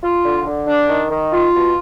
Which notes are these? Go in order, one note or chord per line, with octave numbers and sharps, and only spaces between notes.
F4
D3
D3
D4
D#3
D#3
F4
B2